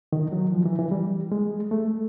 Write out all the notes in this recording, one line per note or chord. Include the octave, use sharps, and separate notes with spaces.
D#3
F#3
F3
E3
E3
G3
G#3
A3